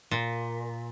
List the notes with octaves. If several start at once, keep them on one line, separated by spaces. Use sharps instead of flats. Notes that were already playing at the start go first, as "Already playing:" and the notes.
A#2